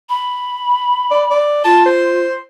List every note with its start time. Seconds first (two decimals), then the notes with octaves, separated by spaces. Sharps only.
0.09 B5
1.11 D5
1.30 D5
1.64 F4 A5
1.86 C5